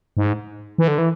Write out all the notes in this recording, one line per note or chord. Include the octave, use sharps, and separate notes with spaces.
G#2
E3
D3
E3